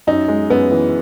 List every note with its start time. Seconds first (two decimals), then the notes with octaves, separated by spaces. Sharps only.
0.07 F#2 D#4
0.28 G#3
0.50 F#2 B3
0.72 E3